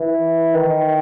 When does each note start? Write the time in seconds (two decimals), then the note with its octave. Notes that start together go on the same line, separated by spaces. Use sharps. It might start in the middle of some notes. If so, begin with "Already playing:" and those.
Already playing: E3
0.54 D#3